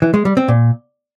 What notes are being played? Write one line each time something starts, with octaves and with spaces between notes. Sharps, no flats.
E3
G#3
G3
C4
A#2